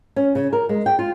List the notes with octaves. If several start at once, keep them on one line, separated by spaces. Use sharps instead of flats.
C#4
C#3
A#4
G#3
G5
F4